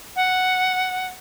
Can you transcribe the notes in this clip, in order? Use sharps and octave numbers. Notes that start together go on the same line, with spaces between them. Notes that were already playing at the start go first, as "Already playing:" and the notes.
F#5